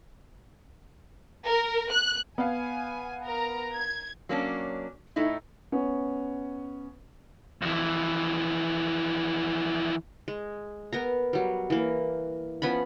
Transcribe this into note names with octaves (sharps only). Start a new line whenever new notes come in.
A#4
F#6
B3 F5 G#5
A#4 A#5
G#6
F#3 A#3 C#4 D4
A2 A3 D#4 E4
B3 C#4
F2 E3
G#3
B3 A#4 A#5
F#3 G3
E3 A#3
F3 B3 C#4 B5